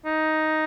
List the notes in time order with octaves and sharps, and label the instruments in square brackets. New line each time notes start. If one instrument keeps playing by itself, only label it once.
[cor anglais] D#4